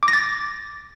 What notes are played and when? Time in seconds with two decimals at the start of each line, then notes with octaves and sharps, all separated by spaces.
0.03 D6
0.08 A#6
0.13 A6